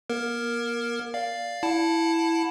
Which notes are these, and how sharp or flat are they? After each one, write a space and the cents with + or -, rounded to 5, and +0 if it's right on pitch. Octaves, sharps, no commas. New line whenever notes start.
A#3 +45 A#4 +0
D5 +0 F5 +0
E4 +0 F#5 -35 A5 +0